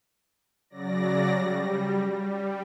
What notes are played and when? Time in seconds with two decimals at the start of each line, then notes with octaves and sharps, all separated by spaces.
0.70 C#3 F#3 D5 A#6
1.30 G3
2.16 G3